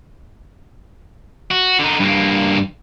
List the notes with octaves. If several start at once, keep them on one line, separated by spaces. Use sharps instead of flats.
F#4
D3 D#4
G2 A#3